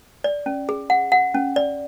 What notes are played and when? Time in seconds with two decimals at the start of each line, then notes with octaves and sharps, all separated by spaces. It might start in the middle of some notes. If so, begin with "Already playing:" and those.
0.24 D5
0.46 C#4
0.69 G#4
0.90 F#5
1.12 F#5
1.34 C#4
1.56 D5